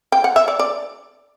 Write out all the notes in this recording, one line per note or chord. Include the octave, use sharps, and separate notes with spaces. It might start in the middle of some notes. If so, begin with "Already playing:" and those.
G5
F#5
E5
D5
D5